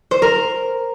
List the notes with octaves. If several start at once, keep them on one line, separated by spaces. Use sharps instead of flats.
C5
A#4